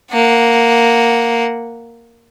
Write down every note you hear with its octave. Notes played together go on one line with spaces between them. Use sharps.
A#3 F#5